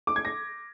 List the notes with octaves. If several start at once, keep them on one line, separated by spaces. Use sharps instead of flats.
D6
G#6
A#6